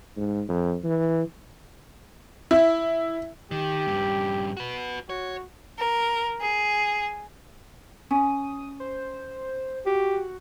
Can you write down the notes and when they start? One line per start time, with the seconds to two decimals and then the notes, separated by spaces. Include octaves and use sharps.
0.17 G#2
0.49 F2
0.83 E3
2.51 E4
3.51 D#3 G4
3.87 G2 C#3
4.57 F#4 B4
5.10 F#4 C#5
5.79 A#4
6.40 G#4
8.11 C#4 D#6
8.80 C5
9.86 F#4 G4